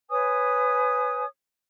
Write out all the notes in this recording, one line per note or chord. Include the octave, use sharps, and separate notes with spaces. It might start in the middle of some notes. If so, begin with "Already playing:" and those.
B4 C#5 G#5 D#6